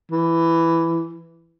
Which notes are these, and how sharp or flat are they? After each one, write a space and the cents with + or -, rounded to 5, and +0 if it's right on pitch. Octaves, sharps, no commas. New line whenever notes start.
E3 +10